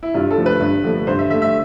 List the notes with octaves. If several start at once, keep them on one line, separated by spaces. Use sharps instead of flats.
E4
G2 F4
A4
D3 F3 A3
B4
G2
D3 F3 A3
G2 C5
E5
D3 A3 E5
E5